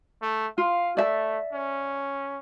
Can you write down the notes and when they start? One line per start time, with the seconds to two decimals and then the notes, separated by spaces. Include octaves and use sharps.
0.22 A3
0.58 F4 F5
0.97 A3 D5 E5 A5
1.53 C#4